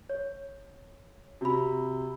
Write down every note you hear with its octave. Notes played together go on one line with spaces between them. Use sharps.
C#5
C3 F#4 B5